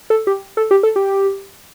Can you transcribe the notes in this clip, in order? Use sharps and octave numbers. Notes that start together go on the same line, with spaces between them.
A4
G4
A4
G4
A4
G4